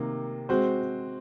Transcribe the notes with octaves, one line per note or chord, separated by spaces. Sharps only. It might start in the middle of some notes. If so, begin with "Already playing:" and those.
Already playing: C3 D#3 A#3
G#3 C4 F#4 C5